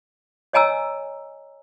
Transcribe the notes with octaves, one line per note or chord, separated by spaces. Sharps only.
C#5 D#5 G#5 A#5 E6